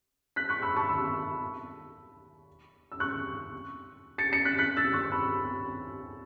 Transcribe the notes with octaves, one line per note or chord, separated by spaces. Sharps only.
F#6 B6
C#6 F#6
B5 E6
A5 C#6
B5 E6
E6
C#6 F#6
A6 C#7
A6 C#7
F#6 B6
F#6 B6
E6 A6
C#6 F#6
B5 E6